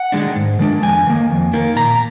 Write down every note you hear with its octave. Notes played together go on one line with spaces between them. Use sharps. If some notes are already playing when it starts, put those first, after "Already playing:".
Already playing: F#5
D#3 G#3 D4
G#2
D#3 G#3 D4
F2 G#5
D#3 A#3
F2
D#3 A#3
A#2 A#5